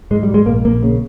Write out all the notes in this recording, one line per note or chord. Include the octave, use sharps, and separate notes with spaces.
G#2 G#3
G3
G#2
G#3
A#1 A#3
A#1 A#3
C#3